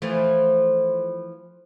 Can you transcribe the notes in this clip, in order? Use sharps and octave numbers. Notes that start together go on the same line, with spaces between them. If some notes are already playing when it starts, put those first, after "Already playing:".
E3 F3 A3